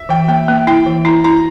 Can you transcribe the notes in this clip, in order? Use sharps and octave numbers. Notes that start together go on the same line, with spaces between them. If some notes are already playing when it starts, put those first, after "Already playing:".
Already playing: E5
E3 G5
A#3 G5
A#3
E4 G5
E3
E4 A#5
E4 A#5